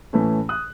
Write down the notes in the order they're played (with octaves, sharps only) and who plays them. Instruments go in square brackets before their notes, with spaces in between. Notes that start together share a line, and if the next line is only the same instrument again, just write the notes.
[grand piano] A2 E3 A3 C#4
D#6 F#6